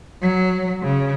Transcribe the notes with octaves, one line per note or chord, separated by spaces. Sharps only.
F#3
C#3